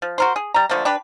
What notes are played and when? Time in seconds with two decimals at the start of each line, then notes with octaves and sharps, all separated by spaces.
0.02 F3
0.18 F#4 A#4 C5
0.36 G#4
0.54 G3 A#5
0.69 D3 F3 A3 A#3
0.85 D4 G4 B4